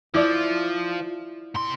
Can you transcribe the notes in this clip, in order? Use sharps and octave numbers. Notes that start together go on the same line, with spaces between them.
F3 E4 D5
C3 C6